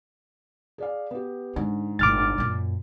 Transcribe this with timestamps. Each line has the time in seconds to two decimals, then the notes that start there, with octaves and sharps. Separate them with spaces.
0.78 G#4 D5 F5
1.11 B3 G4
1.56 G#2 D3
1.99 G1 A2 D6 F6 A6
2.38 F#2 A#2